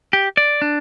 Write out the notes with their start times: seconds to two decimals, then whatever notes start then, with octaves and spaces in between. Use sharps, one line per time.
0.13 G4
0.37 D5
0.62 D4